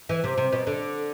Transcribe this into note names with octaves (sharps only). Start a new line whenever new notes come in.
E3
C3
C3
B2
D3